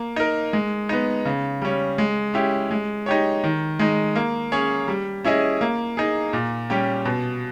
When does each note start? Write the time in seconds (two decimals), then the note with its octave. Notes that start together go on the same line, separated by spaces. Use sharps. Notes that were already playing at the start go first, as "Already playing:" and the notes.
Already playing: A#3
0.16 D#4 A#4
0.53 G#3
0.89 B3 D#4
1.25 C#3
1.62 G3 C#4
1.98 G#3
2.34 C#4 E4 G4
2.71 G#3
3.06 D#4 G4 C#5
3.44 D#3
3.79 G#3 D#4
4.16 A#3
4.52 C#4 G#4 C#5
4.88 G3
5.24 C#4 E4 G#4 D#5
5.61 A#3
5.97 D#4 G#4
6.33 A#2
6.70 G3 C#4 G4
7.05 B2